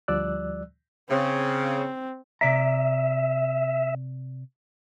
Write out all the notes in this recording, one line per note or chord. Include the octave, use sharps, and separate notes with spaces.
D2 F3 G3 D5 E6 F#6
C#3 C4
C3 D5 E5 A#5